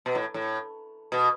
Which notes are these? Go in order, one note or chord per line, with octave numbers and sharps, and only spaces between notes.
B2
A2
A2
B2